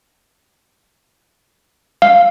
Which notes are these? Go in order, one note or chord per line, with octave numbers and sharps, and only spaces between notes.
F5